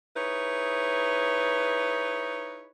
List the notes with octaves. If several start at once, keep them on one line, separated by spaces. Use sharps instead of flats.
D#4 E4 G#4 B4 C#5